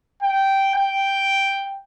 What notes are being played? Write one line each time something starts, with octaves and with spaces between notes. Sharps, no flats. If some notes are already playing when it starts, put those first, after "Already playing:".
G5
G5